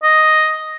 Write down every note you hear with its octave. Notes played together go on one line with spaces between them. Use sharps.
D#5